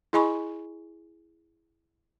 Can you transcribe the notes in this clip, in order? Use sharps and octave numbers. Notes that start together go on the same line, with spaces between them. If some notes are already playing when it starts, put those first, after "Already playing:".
E4 G#4 D#5 G#5 B5 C#6